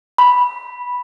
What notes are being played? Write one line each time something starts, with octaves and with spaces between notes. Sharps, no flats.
B5